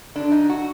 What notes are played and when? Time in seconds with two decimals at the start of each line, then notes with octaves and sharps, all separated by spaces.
0.15 D3 F#3 D4
0.32 D#4
0.49 F#4